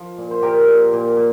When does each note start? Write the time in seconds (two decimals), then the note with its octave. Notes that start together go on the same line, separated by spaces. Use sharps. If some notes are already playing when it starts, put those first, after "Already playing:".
Already playing: F3 D#5
0.18 A#2
0.31 C5
0.42 A#2 G4 A#4
0.68 A#2
0.93 A#2
1.17 A#2